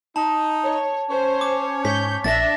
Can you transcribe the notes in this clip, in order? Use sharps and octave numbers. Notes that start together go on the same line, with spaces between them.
D#4 A5
C#5
C#4 C5 C#5
D6
G#2 G6 B6
A#1 D4 E5 A6 A#6